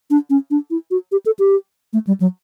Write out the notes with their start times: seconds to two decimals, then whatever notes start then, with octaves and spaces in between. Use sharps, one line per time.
0.10 D4
0.30 C#4
0.51 D4
0.70 E4
0.91 F#4
1.12 G4
1.26 A4
1.39 G4
1.93 A3
2.07 G3
2.20 F#3